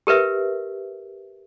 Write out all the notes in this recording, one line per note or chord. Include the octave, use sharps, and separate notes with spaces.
G4 A#4 B4 E5